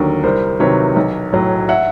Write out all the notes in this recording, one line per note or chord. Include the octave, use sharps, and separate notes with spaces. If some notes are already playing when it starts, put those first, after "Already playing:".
Already playing: D#2 D3 F#3 A#4
C2 A#4 C5
C3 D#3 F#3 B4 C#5
B1
A2 F#3
E5 F#5